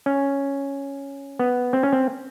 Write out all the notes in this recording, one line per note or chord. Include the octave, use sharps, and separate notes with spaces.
C#4
B3
C4
C#4
C4